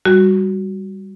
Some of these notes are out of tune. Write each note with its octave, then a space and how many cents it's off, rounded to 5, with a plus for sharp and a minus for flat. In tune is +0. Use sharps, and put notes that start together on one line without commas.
G3 +5 F#4 +0